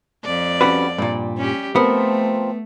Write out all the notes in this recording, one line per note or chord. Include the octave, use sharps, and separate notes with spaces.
F2 D5
G3 C#4 F#4 B4
G2 A#2 G3
C#4 G4
F3 A3 B3 C4 A#4